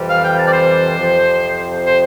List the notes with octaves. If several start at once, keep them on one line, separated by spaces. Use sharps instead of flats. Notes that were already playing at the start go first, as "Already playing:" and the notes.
Already playing: F2 C3 E3 G3
F5
G5
A5
D5
C5
F2 C3 F3
C5